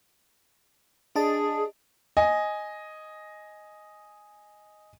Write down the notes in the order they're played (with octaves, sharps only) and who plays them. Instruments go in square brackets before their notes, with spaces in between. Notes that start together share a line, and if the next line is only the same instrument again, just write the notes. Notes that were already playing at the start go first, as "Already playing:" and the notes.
[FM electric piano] D4 D#5 A5 [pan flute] G#4
[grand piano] D#5 G#5